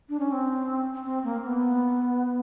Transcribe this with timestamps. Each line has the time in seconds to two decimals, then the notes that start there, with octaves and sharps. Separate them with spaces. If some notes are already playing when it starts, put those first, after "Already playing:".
0.09 D4
0.20 C#4
0.32 C4
1.06 C4
1.24 A#3
1.43 C4
1.47 B3